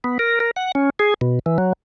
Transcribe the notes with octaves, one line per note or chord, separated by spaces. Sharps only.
B3
A#4
A#4
F#5
C#4
G#4
B2
E3
F#3